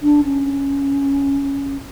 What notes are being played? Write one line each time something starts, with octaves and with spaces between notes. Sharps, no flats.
D4
C#4